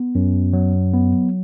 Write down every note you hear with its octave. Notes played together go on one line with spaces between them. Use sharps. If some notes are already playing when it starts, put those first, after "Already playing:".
Already playing: B3
F#2
F#3
B3